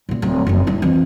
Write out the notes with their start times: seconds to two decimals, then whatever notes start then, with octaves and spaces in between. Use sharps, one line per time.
0.09 A1 A#2
0.22 D1
0.47 F#1 F2
0.67 G3 E4
0.82 F2 E3